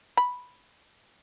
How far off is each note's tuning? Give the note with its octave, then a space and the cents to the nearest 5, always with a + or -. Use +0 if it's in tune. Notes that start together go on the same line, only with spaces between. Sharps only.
B5 +0